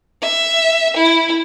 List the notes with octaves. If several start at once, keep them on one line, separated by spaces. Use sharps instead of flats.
E5
E4